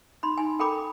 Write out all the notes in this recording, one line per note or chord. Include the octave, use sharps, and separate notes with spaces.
D#4 B5 C6
D#4 G#5
A4 A#4 G5 A#5 B5 D6